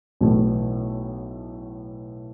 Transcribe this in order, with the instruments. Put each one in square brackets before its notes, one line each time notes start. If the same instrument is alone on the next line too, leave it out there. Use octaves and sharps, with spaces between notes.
[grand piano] B1 A2 E3 A3